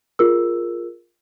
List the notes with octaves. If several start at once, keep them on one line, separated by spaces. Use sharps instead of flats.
F4 G#4 A#4 E6